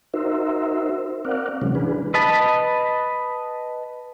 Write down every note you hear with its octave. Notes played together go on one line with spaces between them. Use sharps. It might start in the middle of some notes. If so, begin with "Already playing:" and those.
D#4 F#4 A#4 C5 E5
C4 A#4 D5 F5 F#5
C3 E3 F#3 G#3 C#4
E3 D4 G#4 B4
B4 D#5 A5 B5